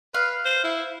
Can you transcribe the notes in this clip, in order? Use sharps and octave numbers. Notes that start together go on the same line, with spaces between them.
B4 F5
C5
E4